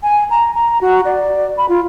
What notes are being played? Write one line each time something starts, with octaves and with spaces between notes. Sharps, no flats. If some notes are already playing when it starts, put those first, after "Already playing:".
G#5
A#5
A#5
F#4
D5
B5
F4